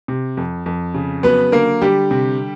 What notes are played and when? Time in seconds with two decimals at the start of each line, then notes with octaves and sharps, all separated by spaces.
0.08 C3
0.37 F2
0.66 F2
0.94 C#3
1.23 F#3 B3 B4
1.52 D3 A#3 A#4
1.82 D3 G3 G4
2.11 C3